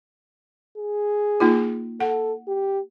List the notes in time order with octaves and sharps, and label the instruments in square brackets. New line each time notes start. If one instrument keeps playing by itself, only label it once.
[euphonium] G#4
[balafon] A#3 D#4 F4
[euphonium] A4 [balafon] F#5
[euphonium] G4